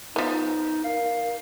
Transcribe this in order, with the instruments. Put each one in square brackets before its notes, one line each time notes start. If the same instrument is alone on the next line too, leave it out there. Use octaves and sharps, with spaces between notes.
[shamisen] F3 B3 [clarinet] D#4
[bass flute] A#4 [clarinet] F5